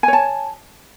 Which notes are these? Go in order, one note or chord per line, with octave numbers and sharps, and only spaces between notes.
C#5 G#5 A5